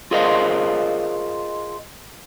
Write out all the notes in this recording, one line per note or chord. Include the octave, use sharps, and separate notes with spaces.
F4 G#4 A#4 C5 D#5 F5